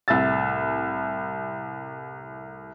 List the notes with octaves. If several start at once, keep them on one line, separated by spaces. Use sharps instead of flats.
C2 A2 E6 A6